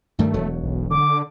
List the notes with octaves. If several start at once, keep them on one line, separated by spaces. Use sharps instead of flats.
G2 D#3 G3 A3
E1 F#3
B1
D3 D6